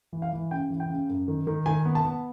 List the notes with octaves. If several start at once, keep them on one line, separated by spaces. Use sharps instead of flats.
E3
F5
E3
C#3 G5
E3
G5
C#3
F#2
D#3
D#3
D#3 G#5
B3
A5
B3